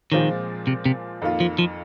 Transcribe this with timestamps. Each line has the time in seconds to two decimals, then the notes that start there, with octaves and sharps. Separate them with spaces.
0.12 A#2 D#3 F3 G#3 C4 F4
0.67 C3
0.85 C3
1.22 F2 D#3 A#3 F4
1.40 F3
1.59 F3